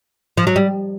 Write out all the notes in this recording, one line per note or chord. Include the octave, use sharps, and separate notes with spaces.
F3
F#3
G3